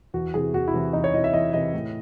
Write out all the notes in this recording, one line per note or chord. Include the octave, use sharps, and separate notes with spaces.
E2 F#4
C3 E3 G#4
E2 F#4
E4
C3 E3
E2 D#4
C#5
C3 E3 D#5
E5
E2 D#5
C3 E3 D#5
A2